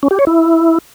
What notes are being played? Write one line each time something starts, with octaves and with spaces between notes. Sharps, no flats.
C#4
G4
C#5
E4